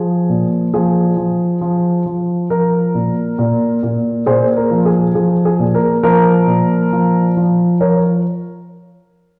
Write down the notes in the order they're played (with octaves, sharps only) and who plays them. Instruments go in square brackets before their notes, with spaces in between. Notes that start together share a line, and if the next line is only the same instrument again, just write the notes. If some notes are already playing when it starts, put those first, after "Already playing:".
Already playing: [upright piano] F3 G#4
A#2
F3 G#4
F3
F3
F3
F3 A#4
A#2
A#2
A#2
A#2 G#4 C5
A#4
F3
G#4
F3 G#4
G#4
A#2
A#4
F3 A#4
A#2
F3
F3
F3 A#4 C#5